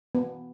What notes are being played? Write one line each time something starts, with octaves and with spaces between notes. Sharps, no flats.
B3